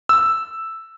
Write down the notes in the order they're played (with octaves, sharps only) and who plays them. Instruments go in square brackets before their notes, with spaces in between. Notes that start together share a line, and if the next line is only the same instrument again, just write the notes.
[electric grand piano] E6